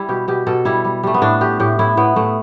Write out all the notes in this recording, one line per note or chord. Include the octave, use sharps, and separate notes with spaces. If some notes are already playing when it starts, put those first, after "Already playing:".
Already playing: G3 E4
B2 G4
B2 G4
B2 A4
G3 E4
G3
G3 A3
B3
A2 D4
A3 G4
A2 G4
A2 E4
A2 B3
A2 A3